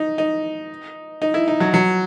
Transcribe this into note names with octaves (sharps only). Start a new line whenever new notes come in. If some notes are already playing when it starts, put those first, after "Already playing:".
Already playing: D#4
D#4
D#4
E4
D#4
F#3
F#3